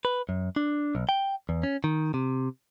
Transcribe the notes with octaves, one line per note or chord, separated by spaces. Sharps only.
B4
F#2
D4
B1
G5
E2
C#4
D#3
C3